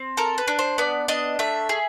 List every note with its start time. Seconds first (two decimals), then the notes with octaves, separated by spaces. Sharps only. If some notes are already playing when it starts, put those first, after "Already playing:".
Already playing: C4
0.17 A4 A#4
0.38 B4
0.48 D4
0.59 C5
0.78 B3 D5
1.08 D4 D#5
1.39 A3 E5
1.69 G#4